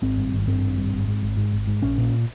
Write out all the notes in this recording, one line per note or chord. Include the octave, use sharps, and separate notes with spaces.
G#1 C4
G2
G#1
G2 C4
G#1
G2
G#1
G#2
G#1
G#2
G#1
G#2
A#1 C#4
A#2